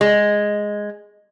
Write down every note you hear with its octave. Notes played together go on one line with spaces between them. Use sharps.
G#3